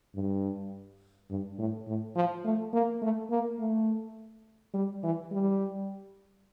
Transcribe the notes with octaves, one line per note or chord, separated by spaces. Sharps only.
G2
G2
A2
A2
F3
A3
A#3
A3
A#3
A3
G3
E3
G3